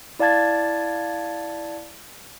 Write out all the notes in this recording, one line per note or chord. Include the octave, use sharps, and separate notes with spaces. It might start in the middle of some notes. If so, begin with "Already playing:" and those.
E4 D5 F5 A5 G#6 A6